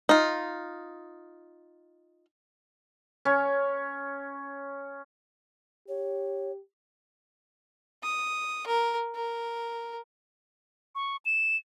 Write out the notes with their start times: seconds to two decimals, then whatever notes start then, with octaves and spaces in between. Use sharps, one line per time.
0.09 D#4 F4
3.25 C#4 C#5
5.88 G4 C#5
8.03 D#6
8.66 A#4
9.15 A#4
10.95 C#6
11.25 E7